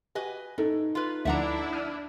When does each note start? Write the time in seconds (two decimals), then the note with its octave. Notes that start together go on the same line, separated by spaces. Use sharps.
0.15 F#4 G4 B4 D#5 G#5
0.58 A2 D#4 A4
0.95 F4 B4
1.25 D2 F3 D4 E4 E5 F#5 A#5
1.73 D5 F6 D#7